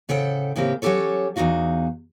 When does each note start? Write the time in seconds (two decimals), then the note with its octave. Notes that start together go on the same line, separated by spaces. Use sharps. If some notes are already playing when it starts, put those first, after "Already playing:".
0.09 A2 C#3 A4 C5 F#5 G5
0.56 A2 C#3 A#3 C4 G4
0.82 F#3 C#4 D4 G4 A4 C#5
1.36 E2 G#2 D#4 F#4 F5